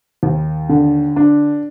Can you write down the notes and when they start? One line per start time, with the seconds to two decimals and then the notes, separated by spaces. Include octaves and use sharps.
0.23 D#2
0.69 D3
1.16 D4